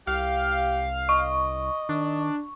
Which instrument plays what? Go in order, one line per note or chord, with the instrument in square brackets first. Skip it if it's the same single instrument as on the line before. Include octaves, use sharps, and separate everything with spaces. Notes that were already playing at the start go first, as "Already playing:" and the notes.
[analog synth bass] C2 [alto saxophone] G4 [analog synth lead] F5
[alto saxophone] D#5 [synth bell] C#6
[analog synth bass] D#3 [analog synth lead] D4